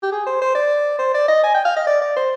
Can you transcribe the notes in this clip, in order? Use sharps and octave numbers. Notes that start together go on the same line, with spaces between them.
G4
G#4
C5
C5
D5
C5
D5
D#5
G#5
G5
F5
D#5
D5
D5
C5